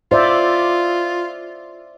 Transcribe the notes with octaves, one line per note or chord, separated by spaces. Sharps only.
F4 C5 D5 E5